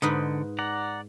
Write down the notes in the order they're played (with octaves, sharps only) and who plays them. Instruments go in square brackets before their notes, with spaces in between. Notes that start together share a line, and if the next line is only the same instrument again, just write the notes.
[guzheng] G#2 D#4 B4 [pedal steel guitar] D3
[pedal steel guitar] D5 F#5 A#5